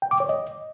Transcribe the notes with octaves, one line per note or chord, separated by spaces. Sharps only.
G5
D6
C#5
D#5